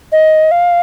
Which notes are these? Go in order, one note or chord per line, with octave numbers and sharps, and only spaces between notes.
D#5
F5